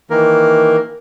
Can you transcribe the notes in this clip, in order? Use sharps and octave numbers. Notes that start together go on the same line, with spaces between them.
D#3 E3 A#3 A#4